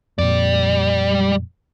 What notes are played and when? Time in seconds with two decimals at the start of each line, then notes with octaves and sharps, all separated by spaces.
0.18 F2 A#2 G3 D5